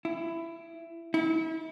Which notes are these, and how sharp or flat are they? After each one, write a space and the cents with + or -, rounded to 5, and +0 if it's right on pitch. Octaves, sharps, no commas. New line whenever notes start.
E4 +15
E4 -35